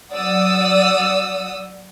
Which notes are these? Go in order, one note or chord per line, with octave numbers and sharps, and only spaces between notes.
F#3 D5 F#5 D#6 E6